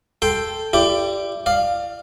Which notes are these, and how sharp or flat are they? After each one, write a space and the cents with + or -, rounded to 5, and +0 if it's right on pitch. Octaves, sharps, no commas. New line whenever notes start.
A4 +0 G5 +5 C6 +0
E4 +40 G4 +0 D5 +0
D5 +30 F5 +0